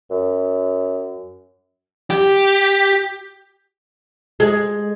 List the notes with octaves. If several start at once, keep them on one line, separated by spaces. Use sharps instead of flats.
F#2
G4
G#3